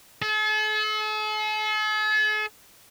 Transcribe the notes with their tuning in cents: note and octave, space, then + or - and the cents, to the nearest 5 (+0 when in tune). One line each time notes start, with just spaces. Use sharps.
A4 -45